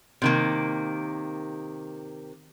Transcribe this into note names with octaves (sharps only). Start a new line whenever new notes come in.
C3 D#3 A#3